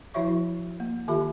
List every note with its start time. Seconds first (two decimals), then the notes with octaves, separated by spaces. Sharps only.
0.14 F3 E4 F#4 C#5 E5 C#6
0.80 A#3
1.08 D#3 F4 G4 E5 B5